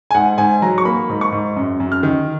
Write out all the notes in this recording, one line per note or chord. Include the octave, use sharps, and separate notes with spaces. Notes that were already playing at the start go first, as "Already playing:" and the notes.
G#5
G#2 F#5
G#2 G#5
F#3 A#5
C#6
A#3 B5
G#2
C#6
G#2
F#2
F#2
F6
D#3